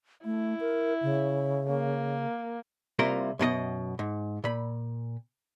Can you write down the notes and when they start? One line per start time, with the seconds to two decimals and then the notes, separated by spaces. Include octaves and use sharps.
0.25 A3 E4
0.60 A#4
1.03 C#3
1.70 A#3
2.99 C2 C3 A#3 F4 A#4 C6
3.39 F#2 B2 A4 D#5
3.99 G#2
4.44 A#2 B5